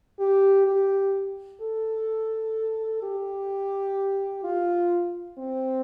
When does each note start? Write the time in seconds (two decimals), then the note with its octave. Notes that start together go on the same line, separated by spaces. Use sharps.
0.20 G4
0.67 G4
1.61 A4
3.03 G4
4.44 F4
5.38 C4